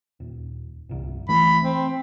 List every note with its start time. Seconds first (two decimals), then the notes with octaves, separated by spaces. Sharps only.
0.20 D#1
0.89 G1 C2
1.29 E3 A3 B5
1.62 C4